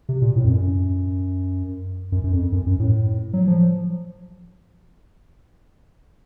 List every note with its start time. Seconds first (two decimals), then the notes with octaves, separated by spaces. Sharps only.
0.09 C3
0.22 A#2
0.36 A2
0.44 F2
0.49 F#2
2.12 F#2
2.24 F#2
2.32 F2
2.52 F#2
2.67 F#2
2.79 A2
3.33 F#3
3.47 F3